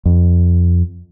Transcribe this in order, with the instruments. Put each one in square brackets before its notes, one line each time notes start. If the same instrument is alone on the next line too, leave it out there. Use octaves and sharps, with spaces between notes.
[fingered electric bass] F2